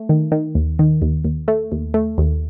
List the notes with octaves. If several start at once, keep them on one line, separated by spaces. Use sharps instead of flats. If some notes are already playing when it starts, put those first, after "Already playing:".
Already playing: A3
D#3
D#3
D#2
D#3
D#2
D#2
A3
D#2
A3
D#2